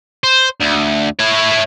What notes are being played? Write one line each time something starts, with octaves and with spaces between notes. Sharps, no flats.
C5
D2
E4 C#5